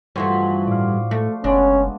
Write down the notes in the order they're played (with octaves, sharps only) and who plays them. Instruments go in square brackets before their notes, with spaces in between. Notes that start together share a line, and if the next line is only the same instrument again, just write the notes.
[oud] G2 E3 A3 [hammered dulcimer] F3 F#4 C5
[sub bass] A2 [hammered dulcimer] D5 F5
[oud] A3
[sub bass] F#1 [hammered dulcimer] G#3 B3 [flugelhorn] C#4 [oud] D4